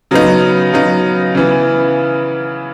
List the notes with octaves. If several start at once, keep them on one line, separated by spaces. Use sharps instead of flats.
C#3 F#3 B3 D#4
C#3 F#3 B3 D#4
C#3 E3 B3